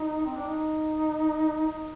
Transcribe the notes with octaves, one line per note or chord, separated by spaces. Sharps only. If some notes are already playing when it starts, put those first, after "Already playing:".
Already playing: D#4
C4
D4
D#4
D#4